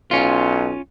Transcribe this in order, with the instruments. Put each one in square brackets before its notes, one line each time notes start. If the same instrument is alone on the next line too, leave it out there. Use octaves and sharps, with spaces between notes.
[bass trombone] B1 [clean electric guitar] C#4 F4